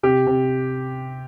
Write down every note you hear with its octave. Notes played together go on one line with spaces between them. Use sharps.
C3 G4
C3